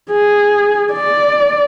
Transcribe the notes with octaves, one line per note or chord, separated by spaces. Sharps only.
G#4
D5